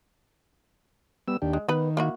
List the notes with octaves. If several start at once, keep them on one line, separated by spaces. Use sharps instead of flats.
G3 B3 E6
D#2 D4 G4
G#3
D#3 B3 B4
A#3 E4 F#4